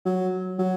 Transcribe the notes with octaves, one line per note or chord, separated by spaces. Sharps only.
F#3
F#3